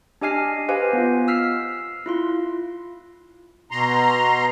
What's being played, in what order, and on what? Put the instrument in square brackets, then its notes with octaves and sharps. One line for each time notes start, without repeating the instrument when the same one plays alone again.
[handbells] D4 G4 D#5 G#5 F6 C7
G4 B4 C5 D#5 F5 G#5
B3 F4
E6 F6 B6 C7
E4 F4 C6
[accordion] B2 A#5 C6